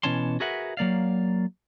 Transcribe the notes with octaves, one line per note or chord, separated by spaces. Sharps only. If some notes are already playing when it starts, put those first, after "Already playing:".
B2 E3 C#4 C#5 A5 C6
F#4 G#4 A#4 B4 E5 F#5
F#3 A#3 D5 F5